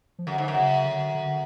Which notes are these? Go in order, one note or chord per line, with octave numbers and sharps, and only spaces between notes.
F3
F#2 D3
G#2
F#2
C#3
D3
D3